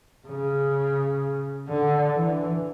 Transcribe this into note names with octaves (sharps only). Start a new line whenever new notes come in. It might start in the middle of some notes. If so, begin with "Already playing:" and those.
C#3
D3
E3